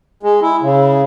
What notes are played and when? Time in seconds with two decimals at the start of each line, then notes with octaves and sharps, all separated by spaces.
0.23 G#3
0.42 E4
0.62 C#3